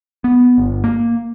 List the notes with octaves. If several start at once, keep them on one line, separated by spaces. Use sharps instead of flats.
B3
G1
A#3